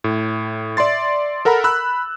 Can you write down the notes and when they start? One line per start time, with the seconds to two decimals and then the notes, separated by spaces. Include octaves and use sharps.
0.04 A2
0.77 D5 E5 C6 A6
1.45 A4 A#4 F#5 A#5 B5
1.64 B5 E6 F#6